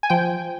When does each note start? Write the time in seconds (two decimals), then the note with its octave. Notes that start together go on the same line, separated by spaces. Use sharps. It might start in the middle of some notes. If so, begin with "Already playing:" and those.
0.03 G#5
0.10 F3 G5